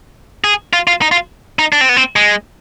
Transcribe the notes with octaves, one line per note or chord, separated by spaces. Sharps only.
G#4
F4
F4
D#4
F4
D#4
D4
C4
B3
C4
G#3